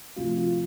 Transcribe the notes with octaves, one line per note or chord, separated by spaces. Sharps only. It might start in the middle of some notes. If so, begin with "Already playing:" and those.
D2 C3 F3 F4
F4